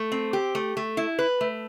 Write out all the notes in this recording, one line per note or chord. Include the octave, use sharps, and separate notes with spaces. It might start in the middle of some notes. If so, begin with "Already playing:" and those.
Already playing: A3
C4
G4
A3
A3
E4
B4
A3